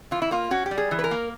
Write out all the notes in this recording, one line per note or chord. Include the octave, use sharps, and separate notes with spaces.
E3 F4
E4
A#3 F4
C#4 F#4
G4
G3
G#4
E3
B4
A#4
A#3